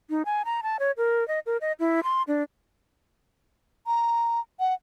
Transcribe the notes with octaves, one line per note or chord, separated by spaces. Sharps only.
D#4
G#5
A#5
A5
C#5
A#4
D#5
A#4
D#5
E4
C6
D4
A#5
F#5